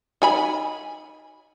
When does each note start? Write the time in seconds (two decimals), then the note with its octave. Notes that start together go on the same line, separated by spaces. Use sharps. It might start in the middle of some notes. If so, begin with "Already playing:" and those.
0.22 D#4 G#5 B5